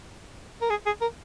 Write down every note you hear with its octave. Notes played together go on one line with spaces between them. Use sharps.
A#4
G#4
G#4
A#4